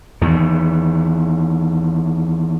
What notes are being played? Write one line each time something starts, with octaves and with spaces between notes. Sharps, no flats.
E2 D#3